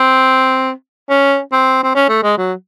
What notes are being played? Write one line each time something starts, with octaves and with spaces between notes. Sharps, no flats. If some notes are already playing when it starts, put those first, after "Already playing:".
Already playing: C4
C#4
C4
C4
C#4
A3
G#3
F#3